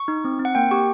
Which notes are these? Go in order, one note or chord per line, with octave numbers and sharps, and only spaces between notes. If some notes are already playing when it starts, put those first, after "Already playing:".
Already playing: C#6
D#4
C4
C4
F#5
A#3 G5
G4 C#6